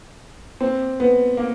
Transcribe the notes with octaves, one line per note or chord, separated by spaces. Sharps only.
C4
B3
A#3